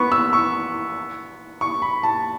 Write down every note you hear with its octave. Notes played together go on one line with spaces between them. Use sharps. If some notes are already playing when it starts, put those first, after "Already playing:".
Already playing: B3 C#6
E6
C#6
C#6
B5
A5